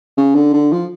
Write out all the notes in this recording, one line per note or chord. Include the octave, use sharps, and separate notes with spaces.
C#3
D3
D3
F3